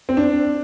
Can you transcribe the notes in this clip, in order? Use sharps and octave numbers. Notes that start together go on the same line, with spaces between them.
C4
D4